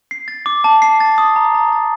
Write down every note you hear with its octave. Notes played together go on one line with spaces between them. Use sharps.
C7
A6
D6
A5
C7
A6
D#6
A#5
A#5
A6